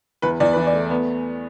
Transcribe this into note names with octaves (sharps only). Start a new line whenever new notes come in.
E2 B4
E2 D5
E3 B4
D5
A3
B3